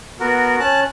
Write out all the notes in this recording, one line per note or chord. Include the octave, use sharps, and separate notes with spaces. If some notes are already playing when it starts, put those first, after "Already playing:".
B3 F#4 A#4
C#4 A5 F#6